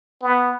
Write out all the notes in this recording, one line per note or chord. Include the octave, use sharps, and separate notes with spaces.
B3